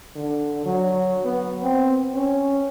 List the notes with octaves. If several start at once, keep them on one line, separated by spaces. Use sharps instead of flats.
D3
F#3
B3
C4
C#4